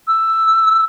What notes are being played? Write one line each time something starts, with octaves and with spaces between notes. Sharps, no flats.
E6